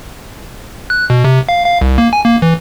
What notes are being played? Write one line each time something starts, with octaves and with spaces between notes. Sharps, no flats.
F#6
B2
C3
F5
F5
C2
A#3
G#5
A#3
E3